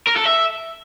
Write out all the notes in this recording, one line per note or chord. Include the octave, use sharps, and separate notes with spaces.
A#4
A4
E5